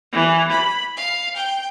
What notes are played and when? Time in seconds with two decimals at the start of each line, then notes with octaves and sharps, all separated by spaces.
0.13 E3
0.52 B5
0.97 F5
1.36 G5